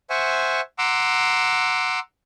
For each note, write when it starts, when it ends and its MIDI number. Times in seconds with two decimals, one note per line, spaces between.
0.10 0.61 72
0.10 0.61 76
0.10 0.61 78
0.10 0.61 80
0.10 0.61 85
0.78 1.99 78
0.78 1.99 82
0.78 1.99 84
0.78 1.99 86
0.78 1.99 88